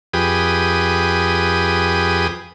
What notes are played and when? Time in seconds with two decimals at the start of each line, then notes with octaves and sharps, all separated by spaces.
0.13 F2 G4 G#4 B4 D#6